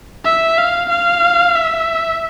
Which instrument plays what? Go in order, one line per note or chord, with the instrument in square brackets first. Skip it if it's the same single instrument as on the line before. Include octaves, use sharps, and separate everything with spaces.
[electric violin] E5
F5
F5
E5